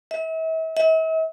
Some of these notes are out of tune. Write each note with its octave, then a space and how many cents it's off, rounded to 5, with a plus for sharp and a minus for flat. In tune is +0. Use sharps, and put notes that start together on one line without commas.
E5 -40
E5 -45